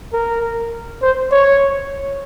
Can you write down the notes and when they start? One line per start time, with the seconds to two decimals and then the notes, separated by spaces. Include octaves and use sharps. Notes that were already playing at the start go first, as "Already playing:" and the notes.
0.13 A#4
1.02 C5
1.31 C#5